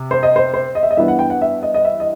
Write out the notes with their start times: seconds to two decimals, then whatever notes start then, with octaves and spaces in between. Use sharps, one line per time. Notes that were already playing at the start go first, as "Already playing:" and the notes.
Already playing: C3
0.11 C5
0.23 D#5
0.36 C5
0.54 C5
0.75 D#5
0.83 E5
0.91 D#5
0.97 G2 E3 B3 E5
1.08 F#5
1.19 G5
1.30 F#5
1.42 E5
1.63 D#5
1.74 D#5
1.85 E5
2.00 D#5